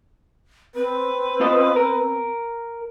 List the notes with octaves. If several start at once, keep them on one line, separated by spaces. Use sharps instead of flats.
C4 B4
F4 C5 D#5
A#4